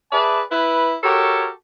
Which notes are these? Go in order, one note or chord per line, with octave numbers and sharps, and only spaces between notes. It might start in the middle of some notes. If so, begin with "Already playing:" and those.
G#4 B4 D5 E5 A5
E4 B4
F#4 G4 A4 A#4 C#5